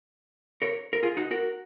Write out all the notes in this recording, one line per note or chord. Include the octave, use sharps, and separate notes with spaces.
A#4 C#5
A#4
F4 G#4
D#4 F#4
F#4 A#4